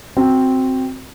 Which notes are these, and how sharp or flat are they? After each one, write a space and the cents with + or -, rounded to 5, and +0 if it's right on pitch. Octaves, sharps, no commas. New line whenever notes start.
C4 +0 F#4 +0